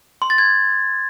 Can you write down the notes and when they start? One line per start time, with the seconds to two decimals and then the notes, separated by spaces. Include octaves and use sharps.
0.22 C6
0.30 A6
0.38 G#6